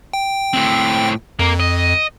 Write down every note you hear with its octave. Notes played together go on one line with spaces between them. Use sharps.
G5
A2 C4
F2 A#3 A#4
D#5